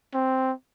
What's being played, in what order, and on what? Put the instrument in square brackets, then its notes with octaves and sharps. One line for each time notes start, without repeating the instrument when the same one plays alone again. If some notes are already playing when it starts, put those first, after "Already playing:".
[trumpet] C4